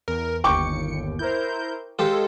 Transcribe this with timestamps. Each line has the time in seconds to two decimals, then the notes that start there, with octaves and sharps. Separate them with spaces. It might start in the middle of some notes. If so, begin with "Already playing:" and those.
0.08 E2 A#4
0.44 G1 D#2 G5 C#6 D6 C#7
1.19 E4 A#4 C5 G6
1.99 G#3 F4 G4 A4 C5